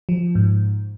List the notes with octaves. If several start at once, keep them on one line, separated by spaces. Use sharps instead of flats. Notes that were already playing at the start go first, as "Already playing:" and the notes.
F3
G#2